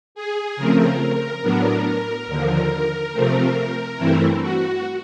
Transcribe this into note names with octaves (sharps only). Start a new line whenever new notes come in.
G#4
C#3 F3 A3 C4 A#4
A2 F#3 B3 D4
D#2 D3 F3
C3 F3 A3 C4
G2 E3 A3 C4 E4
F#4